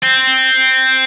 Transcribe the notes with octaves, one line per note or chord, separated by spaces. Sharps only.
C4